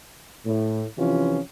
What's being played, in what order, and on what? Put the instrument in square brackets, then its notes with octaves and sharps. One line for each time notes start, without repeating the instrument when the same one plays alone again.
[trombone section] A2
C3 E3 F3 C#4 F4